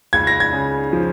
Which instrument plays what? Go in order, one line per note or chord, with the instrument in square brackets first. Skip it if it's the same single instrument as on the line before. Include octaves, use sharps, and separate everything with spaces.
[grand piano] C#2 G#6
A#6
G#6
C#3
F3